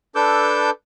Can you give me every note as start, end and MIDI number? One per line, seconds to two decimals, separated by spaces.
0.15 0.70 62
0.15 0.70 69
0.15 0.70 71
0.15 0.70 86
0.15 0.70 88
0.15 0.70 91